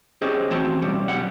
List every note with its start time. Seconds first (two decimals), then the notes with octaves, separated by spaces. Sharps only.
0.22 C#4 G4 G#4 C5 D#5
0.50 A2 E3 C4 F#4 A5 C6
0.82 B1 G3 C#4
1.08 B1 F2 G3 F#5